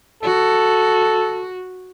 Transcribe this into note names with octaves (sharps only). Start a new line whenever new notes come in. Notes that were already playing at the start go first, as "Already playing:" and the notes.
F#4 A4